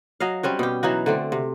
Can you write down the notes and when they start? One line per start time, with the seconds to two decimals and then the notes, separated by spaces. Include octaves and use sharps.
0.20 F#3 D#5 F5
0.43 G3 C4 C#4 F#4
0.59 B2 G4
0.83 E3 F#3 D#4 F#4
1.06 D3 A3 C4
1.32 C3